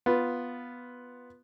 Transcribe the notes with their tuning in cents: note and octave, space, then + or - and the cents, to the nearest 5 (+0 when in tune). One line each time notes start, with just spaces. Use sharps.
B3 +0 F4 +0